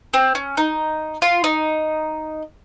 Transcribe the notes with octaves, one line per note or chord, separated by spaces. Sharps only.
C4
C#4
D#4
F4
D#4